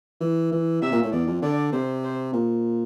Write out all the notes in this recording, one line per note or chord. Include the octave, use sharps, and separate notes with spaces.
E3
E3
C3 E5
A#2
A2
E2 D5
F2
D3 D5
C3 C5
C5
A#2